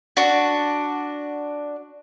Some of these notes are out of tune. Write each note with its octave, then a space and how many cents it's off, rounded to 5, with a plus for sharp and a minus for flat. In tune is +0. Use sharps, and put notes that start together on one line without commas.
D4 +0 F#4 +0